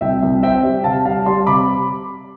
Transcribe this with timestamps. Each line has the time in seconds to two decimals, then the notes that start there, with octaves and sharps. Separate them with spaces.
0.01 C2 E5 G5
0.23 C2
0.43 C4 E5 G5
0.63 G3
0.84 C3 F5 A5
1.05 G3 F5 A5
1.25 G3 A5 C6
1.46 C3 B5 D6